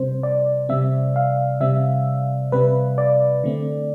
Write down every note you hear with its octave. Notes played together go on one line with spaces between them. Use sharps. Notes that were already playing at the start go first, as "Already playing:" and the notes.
Already playing: C3 G3 C4 C5
D5
C3 G3 C4 E5
F5
C3 G3 C4 E5
C3 G3 C4 B4
D5
D3 A3 C4